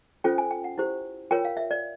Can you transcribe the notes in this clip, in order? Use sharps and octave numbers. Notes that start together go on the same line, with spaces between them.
C#4 F4 A4 C5 G5
G#5
G5
F#5
E4 G4 C5
F4 A#4 C#5 G5
F5
E5
D5